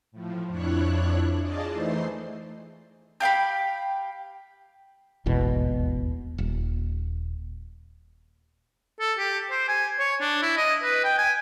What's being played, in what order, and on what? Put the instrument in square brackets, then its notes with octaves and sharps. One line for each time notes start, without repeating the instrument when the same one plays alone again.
[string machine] A2 F3
F2 F3 D4 E4 C#5 F#6
F4 G#4 D5 D#5 A5
E3 A3 D#4 C5 C6
[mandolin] G4 F5 G5 B5
[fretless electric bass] D#1 G#1 E2 B2
D#1
[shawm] A4
G4
C5
G#5
C#5
D4
E4
D#5
B4
G5
G#5